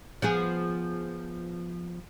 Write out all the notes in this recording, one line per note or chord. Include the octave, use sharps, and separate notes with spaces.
F3 B3 G#4